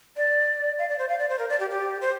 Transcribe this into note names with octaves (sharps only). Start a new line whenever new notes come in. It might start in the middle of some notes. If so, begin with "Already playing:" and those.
D5
F5
D5
C5
F5
D5
C5
A#4
D5
G4
G4
C5